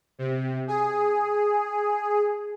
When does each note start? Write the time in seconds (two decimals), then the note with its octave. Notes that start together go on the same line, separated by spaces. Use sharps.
0.19 C3
0.68 G#4